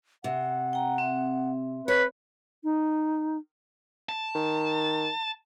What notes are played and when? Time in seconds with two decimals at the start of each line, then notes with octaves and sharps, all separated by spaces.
0.24 C3 F#5
0.73 G5 A#5
0.98 C4 E5
1.88 B4 C#5
2.63 D#4
4.09 A5
4.35 D#3